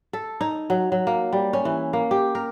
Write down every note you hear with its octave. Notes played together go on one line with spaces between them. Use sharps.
A4
D#4
F#3
F#3
A#3
G3
C#4
E3
A#3
G4
A#4